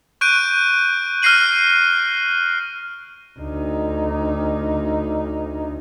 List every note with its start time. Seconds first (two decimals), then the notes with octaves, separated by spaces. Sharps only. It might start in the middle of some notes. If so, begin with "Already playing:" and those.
0.21 C#6 F#6 G6 D7 D#7
1.22 F6 F#6 A#6 C7 D#7 F#7
3.39 D2 D#4